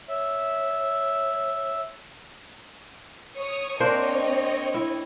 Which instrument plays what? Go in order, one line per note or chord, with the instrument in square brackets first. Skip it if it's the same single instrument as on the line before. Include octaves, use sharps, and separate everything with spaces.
[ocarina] C#5 [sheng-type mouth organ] E5
[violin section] C#5 C#6 D#6
[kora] A#3 D4 C5 [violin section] C4 C#5 D#5
[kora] E4